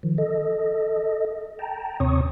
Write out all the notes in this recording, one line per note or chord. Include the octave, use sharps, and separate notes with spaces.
D#3 F3
A4 D#5
G5 A5 A#5
D#2 C3 C4 C#5 C#6 D#6